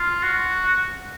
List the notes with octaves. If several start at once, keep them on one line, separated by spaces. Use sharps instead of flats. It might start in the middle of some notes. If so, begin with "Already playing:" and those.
Already playing: F4
F#4